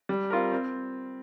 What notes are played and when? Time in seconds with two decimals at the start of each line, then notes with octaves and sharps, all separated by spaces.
0.09 G3
0.30 C4 F4 A#4
0.52 C4